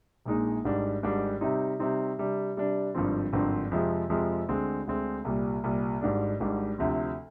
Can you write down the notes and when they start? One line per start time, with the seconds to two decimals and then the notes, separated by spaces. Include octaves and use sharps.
0.26 A#1 A#2 G#3 D#4
0.65 G#1 G#2 G3 D4
1.03 G#1 G#2 G3 D4
1.41 C3 G3 C4 D#4
1.79 C3 G3 C4 D#4
2.18 C3 G3 D4
2.56 C3 G3 D4
2.95 G#1 G2 D3 F3 C4
3.33 G#1 G2 D3 F3 C4
3.71 F2 C3 F3 G#3
4.10 F2 C3 F3 G#3
4.49 D2 D3 G#3 C4
4.87 D2 D3 G#3 C4
5.25 C2 A#2 G3
5.64 C2 A#2 G3
6.01 G#1 G#2 G3 D4
6.40 G#1 G#2 G3 D4
6.78 D2 C3 F3 C4